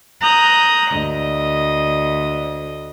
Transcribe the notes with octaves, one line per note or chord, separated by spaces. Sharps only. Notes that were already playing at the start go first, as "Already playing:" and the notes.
A#5 D#6 F#6 G6
D2 D#5